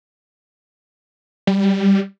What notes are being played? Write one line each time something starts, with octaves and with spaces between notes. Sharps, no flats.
G3